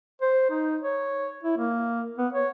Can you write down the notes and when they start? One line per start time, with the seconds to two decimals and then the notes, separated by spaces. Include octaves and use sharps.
0.21 C5
0.50 D#4
0.81 C#5
1.43 E4
1.58 A#3
2.18 B3
2.33 C#5